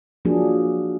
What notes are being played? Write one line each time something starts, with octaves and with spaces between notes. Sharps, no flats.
F3 F#3 A#3 D4 G#4